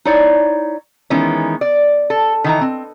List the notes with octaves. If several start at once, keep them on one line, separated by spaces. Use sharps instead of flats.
D#4 E4 C#5 D5
D#3 E3 G#3 B3 C#4
D5
A4
D#3 E3 A#5
C4